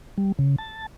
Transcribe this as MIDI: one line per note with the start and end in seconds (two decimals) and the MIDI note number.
0.18 0.32 55
0.39 0.56 49
0.58 0.86 81